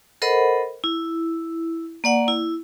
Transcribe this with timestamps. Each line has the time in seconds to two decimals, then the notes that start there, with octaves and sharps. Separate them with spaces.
0.22 A4 A#4 C5 D#5 F#5 B5
0.84 E4
2.04 A#3 D5 F#5
2.28 E4